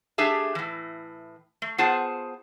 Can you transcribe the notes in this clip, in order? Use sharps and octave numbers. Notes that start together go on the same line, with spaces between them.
A3 D4 G4 G#4 E5
A2 E3
A3
B3 F4 G#4 C5 F#5 A5